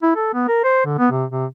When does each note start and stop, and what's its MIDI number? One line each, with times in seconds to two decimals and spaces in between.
0.03 0.11 64
0.16 0.32 69
0.34 0.48 59
0.48 0.63 70
0.64 0.83 72
0.85 0.97 50
0.99 1.08 59
1.11 1.25 48
1.30 1.45 48